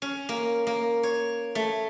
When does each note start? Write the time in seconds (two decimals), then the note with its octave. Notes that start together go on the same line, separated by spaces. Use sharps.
0.02 C#4
0.29 A#3
0.67 A#3
1.03 C#5
1.55 A3